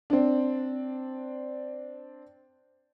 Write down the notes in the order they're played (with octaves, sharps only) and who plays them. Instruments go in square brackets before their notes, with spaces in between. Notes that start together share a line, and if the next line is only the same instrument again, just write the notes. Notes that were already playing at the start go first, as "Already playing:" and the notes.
[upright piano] C4 D4